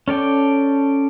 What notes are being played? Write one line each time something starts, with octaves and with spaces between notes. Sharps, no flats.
C#4 A4 D5 G5